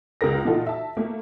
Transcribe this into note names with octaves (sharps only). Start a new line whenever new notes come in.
C#2 G#3 A#4 A#6
A#2 E3 D#4 F4 F#4 A4
E5 A5
A3 A#3